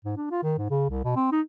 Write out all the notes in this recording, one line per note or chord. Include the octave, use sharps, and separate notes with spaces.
G#2
D4
F4
D#3
G#2
C#3
C2
B2
C4
D#4